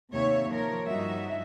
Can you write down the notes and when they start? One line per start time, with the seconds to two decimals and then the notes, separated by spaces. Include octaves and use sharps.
0.11 D#2 C3 C#5 E5
0.52 F3 A#4 C#5
0.87 G2 F3 D#4 F#4 E5